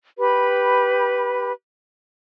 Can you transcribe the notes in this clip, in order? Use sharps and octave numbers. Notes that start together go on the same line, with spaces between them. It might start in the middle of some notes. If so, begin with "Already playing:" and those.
G4 B4 B5